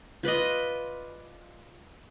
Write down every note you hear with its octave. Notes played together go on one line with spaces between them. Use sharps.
F4 B4 D5 D#5